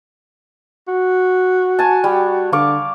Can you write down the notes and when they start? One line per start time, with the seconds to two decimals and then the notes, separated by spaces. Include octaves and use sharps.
0.88 F#4
1.79 G#5 A5
2.04 G3
2.53 D3 F5 C#6 D6